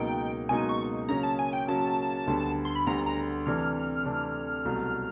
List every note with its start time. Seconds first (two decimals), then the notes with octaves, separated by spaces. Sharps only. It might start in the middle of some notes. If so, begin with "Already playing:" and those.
Already playing: C#2 B2 F#3 A#3 D#4 G5
0.49 C#2 B2 F#3 A#3 D#4 G#5
0.69 C#6
1.08 C#3 F#3 A#3 C#4 A#5
1.23 A5
1.39 G#5
1.53 G5
1.67 C#3 F#3 A#3 C#4 A5
2.27 D2 D3 G3 B3
2.65 C6
2.75 B5
2.87 D2 D3 G3 B3 A#5
3.06 A#5
3.46 C3 E3 A3 D4 F6
4.05 C3 E3 A3 D4
4.65 C2 B2 F#3 A3